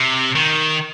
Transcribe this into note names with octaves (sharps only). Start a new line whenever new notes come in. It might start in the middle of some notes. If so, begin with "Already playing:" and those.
Already playing: C3
D#3